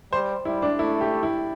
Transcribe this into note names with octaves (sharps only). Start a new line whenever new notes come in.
G3 C5
G3 E4
D4
A3 E4
G4
E4